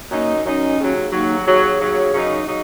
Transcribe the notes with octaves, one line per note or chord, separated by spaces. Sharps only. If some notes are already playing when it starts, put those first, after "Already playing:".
F#2 F#3 A#3 D#4
F#2 F#3 C#4 D#4
D#2 C#3 F#3
D#2 C#3 F#3 A#3 D#4
D#2 C#3 F#3 G#4 C#5
D#2 C#3 F#3
F#2 C#3 F#3 D#4
C#3 F#3 D#4